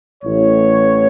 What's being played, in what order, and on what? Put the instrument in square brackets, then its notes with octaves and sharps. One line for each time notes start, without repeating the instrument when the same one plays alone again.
[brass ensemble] A1 A2 E3 C#5